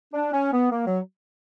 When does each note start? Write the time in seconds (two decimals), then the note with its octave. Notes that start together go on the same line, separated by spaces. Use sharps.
0.13 D4
0.33 C#4
0.53 B3
0.72 A#3
0.87 F#3